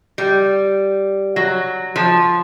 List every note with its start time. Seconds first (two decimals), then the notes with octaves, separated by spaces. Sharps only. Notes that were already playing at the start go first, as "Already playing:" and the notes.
0.18 G3
1.36 F#3
1.96 F3